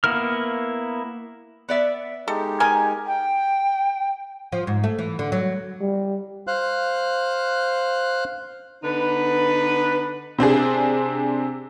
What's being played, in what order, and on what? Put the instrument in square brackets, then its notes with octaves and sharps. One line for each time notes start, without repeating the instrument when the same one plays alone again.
[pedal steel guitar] A#3 B3 E4 A#4 F6
[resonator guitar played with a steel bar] B3 D5 E5
[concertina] G#3 D#4 G4 [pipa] A4
[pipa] A#4 D#5 G#5
[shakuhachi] G5
[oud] F3
G#2
A3
E3
D3
F#3
[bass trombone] G3
[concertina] C5 F5 F#6
[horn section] D3 B3 D#4 B4
[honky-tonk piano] C3 C4 D4 G#4